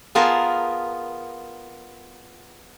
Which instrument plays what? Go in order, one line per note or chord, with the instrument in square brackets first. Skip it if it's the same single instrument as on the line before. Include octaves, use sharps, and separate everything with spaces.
[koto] B3 F4 G#4 A#4 A5